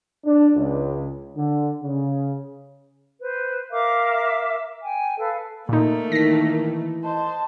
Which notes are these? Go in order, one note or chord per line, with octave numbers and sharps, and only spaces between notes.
D4
C#2
D3
C#3
B4 C5
A#4 E5 F5 D6
G5 G#5
A4 B4 F5
A#2 A3 A#3 D#4
D#3 E3 A#6 B6
C5 D#5 A5